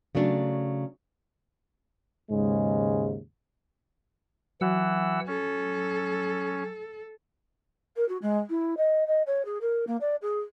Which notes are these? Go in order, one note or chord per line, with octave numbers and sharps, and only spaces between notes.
C#3 F#3 A3 D4
D#2 G#2 C#3 G#3
E3 F#3 F#5 E6
C#4 A4
A#4
F#4
G#3
E4
D#5
D#5
C#5
G#4
A#4
A#3
D5
G#4